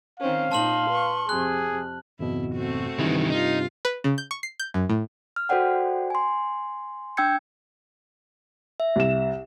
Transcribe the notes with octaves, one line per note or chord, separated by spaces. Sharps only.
D#3 C4 C#4 F5
A#2 D#4 A5 C6 F6 F#7
B4 C#6
F2 C3 G#4 F#6
G#1 F2 B2 E4
A3 C4 F#4
G2 C3 D#3 E3
D#4 F4
B4
C#3
G6
C#6
C7
G6
F#2
A2
F6
F#4 A4 C5 D5 F#5 G5
G#5 C6
D4 G5 E6 G6 G#6 C#7
E5
C2 E7